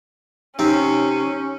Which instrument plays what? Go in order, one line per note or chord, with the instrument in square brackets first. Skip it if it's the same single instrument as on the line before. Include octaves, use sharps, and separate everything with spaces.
[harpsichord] C3 C4 [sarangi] C#4 [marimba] D#4